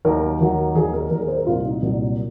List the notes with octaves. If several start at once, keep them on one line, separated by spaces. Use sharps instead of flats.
D#2 D#3 F#3 A#4
D#2 D#3 F#3
D#2 D#3 F#3 G#4
A#4
D#2 D#3 F#3 A#4
G#4
C5
A#4
C2 A#2 F#3 F4
D#4
C2 A#2 F#3